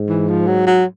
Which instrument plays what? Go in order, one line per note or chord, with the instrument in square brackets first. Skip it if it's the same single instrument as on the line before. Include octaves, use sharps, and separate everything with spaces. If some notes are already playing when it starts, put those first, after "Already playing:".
Already playing: [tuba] G#2
[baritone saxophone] E3
F3
F#3
F#3